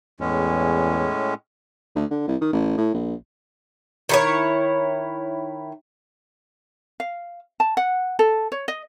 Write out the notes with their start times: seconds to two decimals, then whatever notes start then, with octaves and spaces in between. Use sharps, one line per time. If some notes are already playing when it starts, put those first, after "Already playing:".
0.20 E2 A2 G#3 C#4
1.95 D2
2.11 D3
2.28 C2
2.41 D#3
2.52 A1
2.77 A2
2.94 A#1
4.09 D#3 E4 C#5
7.00 F5
7.60 A5
7.77 F#5
8.19 A4
8.52 C#5
8.68 D#5